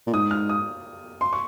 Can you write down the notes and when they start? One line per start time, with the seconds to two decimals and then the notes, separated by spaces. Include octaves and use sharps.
0.07 A#2
0.13 G#2 D#6
0.31 F6
0.49 D#6
1.21 C6
1.33 C#6